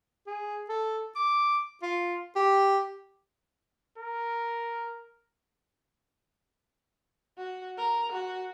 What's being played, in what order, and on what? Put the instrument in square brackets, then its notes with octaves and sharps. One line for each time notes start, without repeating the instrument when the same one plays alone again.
[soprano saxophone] G#4
A4
D6
F4
G4
[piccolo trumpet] A#4
[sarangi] F#4
A#4
F#4